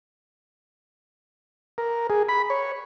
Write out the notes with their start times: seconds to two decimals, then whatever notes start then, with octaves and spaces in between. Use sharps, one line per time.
1.78 A#4
2.10 G#4
2.29 B5
2.50 C#5